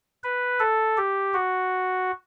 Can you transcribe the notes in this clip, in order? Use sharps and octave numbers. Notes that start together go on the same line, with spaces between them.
B4
A4
G4
F#4